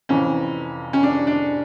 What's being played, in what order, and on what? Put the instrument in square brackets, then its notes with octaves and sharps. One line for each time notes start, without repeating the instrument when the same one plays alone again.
[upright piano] F1 F2 E3 C#4
C#4
D4
D4